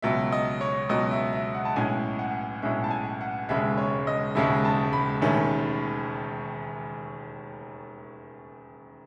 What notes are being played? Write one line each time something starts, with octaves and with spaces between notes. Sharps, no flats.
C#2 B2 F#3 E5
D#5
C#5
C#2 B2 F#3 D#5
E5
E5
F#5
A5
B1 A2 G#3 C#4 G#5
F#5
B1 A2 G#3 C#4 E5
A5
G#5
F#5
E1 D#2 C#3 G#3 E5
C#5
D#5
E1 D#2 C#3 G#3 E5
A5
B5
E1 D#2 D#3 A3 C#4